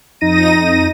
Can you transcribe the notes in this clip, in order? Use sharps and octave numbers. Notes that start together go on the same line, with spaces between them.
F2 D#4 A#6 D#7